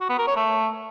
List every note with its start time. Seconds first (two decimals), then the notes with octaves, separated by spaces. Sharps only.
0.01 F#4
0.09 B3
0.18 A#4
0.27 C#5
0.36 A3